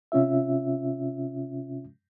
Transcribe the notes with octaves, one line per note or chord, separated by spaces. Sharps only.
C3 C#4 F4 E5